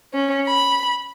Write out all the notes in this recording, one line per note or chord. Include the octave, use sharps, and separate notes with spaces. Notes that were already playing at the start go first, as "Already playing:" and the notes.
C#4
B5